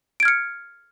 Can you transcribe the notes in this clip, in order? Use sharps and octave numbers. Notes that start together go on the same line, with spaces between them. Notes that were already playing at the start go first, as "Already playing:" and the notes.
F6 G#6 C#7 D7